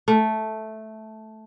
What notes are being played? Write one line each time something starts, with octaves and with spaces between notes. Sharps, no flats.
A3